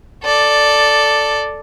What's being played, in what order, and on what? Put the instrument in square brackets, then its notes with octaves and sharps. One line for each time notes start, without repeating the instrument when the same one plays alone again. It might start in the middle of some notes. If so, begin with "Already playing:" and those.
[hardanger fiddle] A4 D5